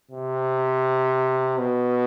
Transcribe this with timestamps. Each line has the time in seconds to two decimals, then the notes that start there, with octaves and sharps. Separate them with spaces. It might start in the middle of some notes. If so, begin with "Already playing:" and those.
0.11 C3
1.58 B2